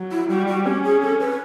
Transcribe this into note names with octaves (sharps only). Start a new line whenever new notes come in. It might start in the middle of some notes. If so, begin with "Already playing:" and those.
Already playing: F#3
E4
G3 F#4
F#4
C#4 G4
G#4
A4
B4